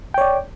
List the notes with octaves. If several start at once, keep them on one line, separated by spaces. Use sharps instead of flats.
C#5 D5 G5